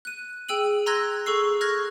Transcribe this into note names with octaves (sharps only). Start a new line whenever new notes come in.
F#6 D#7
G#4 G5 E6 D#7 F#7
A#5 C6 E6 F#6 G#6 A#6
G#4 A4 C#6 E6 C7
C#6 F6 F#6 G#6 A#6